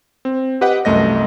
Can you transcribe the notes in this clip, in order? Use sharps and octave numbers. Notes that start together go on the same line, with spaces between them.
C4
G4 B4 D#5 F#5
C2 F#2 A3 D#5 A#6